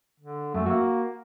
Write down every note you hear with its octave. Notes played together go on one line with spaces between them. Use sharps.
D3
F#2 A3
A#3 F#4